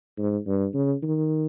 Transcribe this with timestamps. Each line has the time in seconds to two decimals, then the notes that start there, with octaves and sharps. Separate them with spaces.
0.19 G#2
0.47 G2
0.74 C#3
1.03 D#3